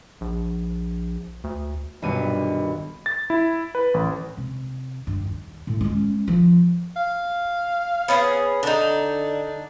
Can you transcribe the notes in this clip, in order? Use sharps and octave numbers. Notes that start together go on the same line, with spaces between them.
A#1
D2
D#1 B1 G2 G3 B3 D#7
A6
E4
B4
A1
C3
G2
D#2
A2
G#3 C#4
F3
F5
B3 C#4 G#4
D3 D4 D#4